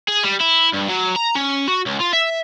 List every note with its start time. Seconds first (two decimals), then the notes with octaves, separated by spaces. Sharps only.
0.08 G#4
0.24 G3
0.41 E4
0.74 G2
0.88 F#3
1.16 A#5
1.35 C#4
1.68 F#4
1.86 C#2
2.00 F4
2.13 E5